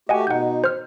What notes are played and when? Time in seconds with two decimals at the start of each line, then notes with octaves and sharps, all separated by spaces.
0.09 A3 F#4 G4 D#5 F#5 G#5
0.27 B2 D#4 F#5 G6
0.64 C5 F6